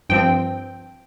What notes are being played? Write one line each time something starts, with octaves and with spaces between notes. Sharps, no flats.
G2 F3 C4 G5